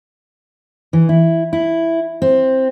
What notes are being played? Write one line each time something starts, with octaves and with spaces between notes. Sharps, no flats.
E3
E4
E4
C4